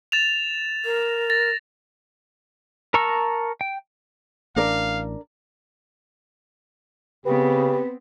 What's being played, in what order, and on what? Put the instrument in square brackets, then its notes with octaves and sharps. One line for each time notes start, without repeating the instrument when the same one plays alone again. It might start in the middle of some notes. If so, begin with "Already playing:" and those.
[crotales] A6 E7 F7
[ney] A#4
[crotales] A6 A#6
[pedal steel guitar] A#4 A5 A#5 C#6 E6
G5
[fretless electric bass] A1 [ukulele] D4 A#4 D5 [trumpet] F5
[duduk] C#3 [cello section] B3 C4 [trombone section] G4 [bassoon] B4